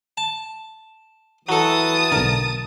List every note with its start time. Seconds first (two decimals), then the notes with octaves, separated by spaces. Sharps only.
0.17 A5
1.49 E3 F#3 A4 A5 D#6
2.12 B1 D3 A#4